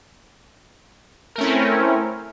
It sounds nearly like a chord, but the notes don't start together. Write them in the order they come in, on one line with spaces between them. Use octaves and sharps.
A#4 A3 C#4 E4 C4